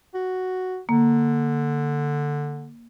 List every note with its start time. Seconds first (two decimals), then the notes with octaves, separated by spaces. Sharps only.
0.14 F#4
0.89 D3 A#3